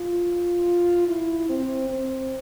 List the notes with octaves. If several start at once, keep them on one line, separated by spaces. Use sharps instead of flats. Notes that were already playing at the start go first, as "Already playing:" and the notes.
Already playing: F4
E4
C4
C4